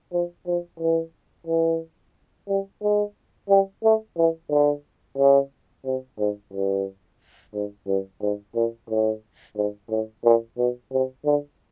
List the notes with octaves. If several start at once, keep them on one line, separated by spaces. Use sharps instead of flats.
F3
F3
E3
E3
G3
G#3
G3
A3
E3
D3
C#3
C3
G#2
G2
G#2
G2
G#2
A#2
A2
G#2
A2
A#2
B2
C3
D3